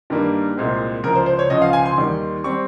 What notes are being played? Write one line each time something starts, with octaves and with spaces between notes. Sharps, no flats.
G2 D#3 G3 A#3
C2 A#2 G#3 C4
C#2 C#3 F3 A#4
C5
C5
C#5
C#2 C#3 F3 D#5
F5
G#5
C6
D#2 D#3 G3
G3 C4 C#6